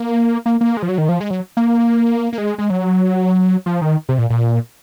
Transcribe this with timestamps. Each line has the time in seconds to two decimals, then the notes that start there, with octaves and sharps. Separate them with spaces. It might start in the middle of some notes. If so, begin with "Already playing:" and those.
Already playing: A#3
0.46 A#3
0.61 A#3
0.77 G#3
0.82 F3
0.89 F#3
0.98 D#3
1.09 F3
1.20 G#3
1.30 F#3
1.57 A#3
2.33 A#3
2.38 G#3
2.58 G#3
2.70 F#3
3.66 F3
3.82 D#3
4.09 C3
4.18 A#2
4.30 A#2